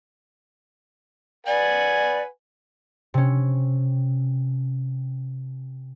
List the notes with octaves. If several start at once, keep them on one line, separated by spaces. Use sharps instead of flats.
B4 D5 F#5 G#5
C3 C#4